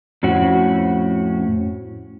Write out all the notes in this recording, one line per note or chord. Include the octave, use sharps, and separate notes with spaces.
F2 A2 C#4 F#4